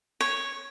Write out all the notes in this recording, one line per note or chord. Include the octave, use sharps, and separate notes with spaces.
C#5